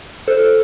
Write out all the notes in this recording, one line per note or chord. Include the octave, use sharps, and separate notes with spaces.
A4 C5